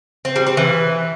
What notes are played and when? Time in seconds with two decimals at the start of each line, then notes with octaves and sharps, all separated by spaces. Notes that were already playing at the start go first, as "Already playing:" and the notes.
0.25 C4
0.36 G3
0.46 C4
0.57 E3